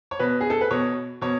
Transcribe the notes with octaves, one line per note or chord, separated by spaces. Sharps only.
C#5
B2 B4
G#4
A4
B4
B2 C#5
B2 C#5